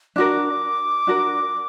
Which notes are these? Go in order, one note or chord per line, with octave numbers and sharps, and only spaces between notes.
D4 F#4 A#4 D6
D4 F#4 A#4